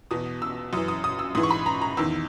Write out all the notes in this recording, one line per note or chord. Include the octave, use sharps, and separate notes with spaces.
E2 B2 D#6
E6
F#2 E3 D#6
D#6
D#6
E6
G#2 E3 D#6
C#6
B5
A#5
A#5
E2 D#3 E6